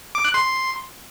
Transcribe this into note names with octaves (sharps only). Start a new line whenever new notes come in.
D6
F#6
C6